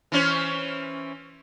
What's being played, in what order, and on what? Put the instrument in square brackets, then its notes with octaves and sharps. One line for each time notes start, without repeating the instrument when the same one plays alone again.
[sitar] E3 C#4 C5